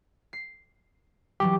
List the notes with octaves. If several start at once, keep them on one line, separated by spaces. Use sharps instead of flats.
C7
E3 F#3 G3 G4